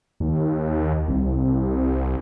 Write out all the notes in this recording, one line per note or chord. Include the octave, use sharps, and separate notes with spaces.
D#2
C2